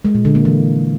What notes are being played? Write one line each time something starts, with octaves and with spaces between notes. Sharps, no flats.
G#3
A#2
D3
A#3
E3